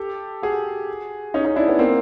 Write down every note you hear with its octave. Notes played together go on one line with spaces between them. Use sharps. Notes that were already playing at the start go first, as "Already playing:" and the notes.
Already playing: G4 A4
F#4 G#4
C#4 D#4
C#4 D#4
D4 E4
B3 C#4
A#3 C4